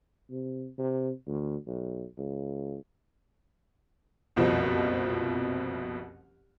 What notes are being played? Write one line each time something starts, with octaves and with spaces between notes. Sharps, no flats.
C3
C3
D2
B1
C#2
F#1 C2 F2 B2 F3